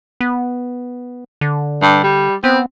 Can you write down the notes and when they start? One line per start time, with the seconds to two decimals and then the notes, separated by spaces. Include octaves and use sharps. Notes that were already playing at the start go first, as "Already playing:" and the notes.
0.20 B3
1.41 D3
1.82 G2
2.03 G3
2.44 B3 C4